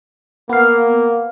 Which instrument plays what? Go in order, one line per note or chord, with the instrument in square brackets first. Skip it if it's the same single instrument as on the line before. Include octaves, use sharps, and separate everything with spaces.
[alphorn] A#3 [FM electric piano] B3 F5